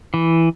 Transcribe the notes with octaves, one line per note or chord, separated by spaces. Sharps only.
E3